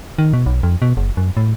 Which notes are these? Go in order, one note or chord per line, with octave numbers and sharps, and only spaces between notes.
D#3
B2
B1
F2
B2
F#1
F#2
A2